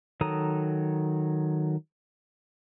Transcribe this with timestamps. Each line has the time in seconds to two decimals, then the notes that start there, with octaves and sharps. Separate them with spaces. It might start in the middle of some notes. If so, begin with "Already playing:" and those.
0.21 D#3 F#3 A4 A#5 D#6